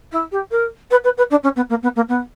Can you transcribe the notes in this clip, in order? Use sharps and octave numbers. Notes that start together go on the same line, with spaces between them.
E4
G4
A#4
B4
B4
B4
D4
C#4
B3
A#3
B3
A#3
B3